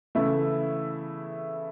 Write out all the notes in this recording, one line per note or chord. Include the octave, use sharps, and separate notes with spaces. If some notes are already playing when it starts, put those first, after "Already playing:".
C#3 E3 A3 E4